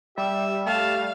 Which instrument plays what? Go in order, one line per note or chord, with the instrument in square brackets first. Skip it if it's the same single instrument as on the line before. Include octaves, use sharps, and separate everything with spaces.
[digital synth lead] G3 [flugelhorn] G4 [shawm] E5
[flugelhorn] A3 [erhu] F5 [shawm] A5